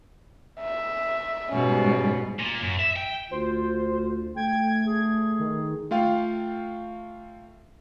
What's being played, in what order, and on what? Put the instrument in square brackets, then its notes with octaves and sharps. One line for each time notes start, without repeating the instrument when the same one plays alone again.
[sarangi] E5
[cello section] G#2 G3 [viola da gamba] B2 [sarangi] C#4
[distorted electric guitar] A#2
F#2
E5
G5
[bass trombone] D2 [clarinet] F4 [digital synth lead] C5
[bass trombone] A3 [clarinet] G5 [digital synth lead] G#6
[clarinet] G#4
[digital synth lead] D#3
[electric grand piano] A3 F4 F5 G5